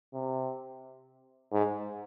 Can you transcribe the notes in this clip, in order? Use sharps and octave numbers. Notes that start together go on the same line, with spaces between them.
C3
G#2